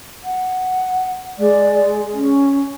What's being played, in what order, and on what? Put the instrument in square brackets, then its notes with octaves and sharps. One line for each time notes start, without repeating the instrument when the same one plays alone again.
[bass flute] F#5
[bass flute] G#3 [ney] D5
[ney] C#4